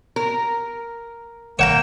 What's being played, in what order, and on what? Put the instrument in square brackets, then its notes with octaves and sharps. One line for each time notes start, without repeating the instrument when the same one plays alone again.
[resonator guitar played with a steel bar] A#4
[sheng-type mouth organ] A#3 G5 [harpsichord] C#5 F#5 A#5 [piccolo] E7